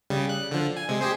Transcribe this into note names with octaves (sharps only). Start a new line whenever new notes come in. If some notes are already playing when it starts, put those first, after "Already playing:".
C#3 G3
F#6
D3 F3
G#5
C3 G#3
G4 G#4 C5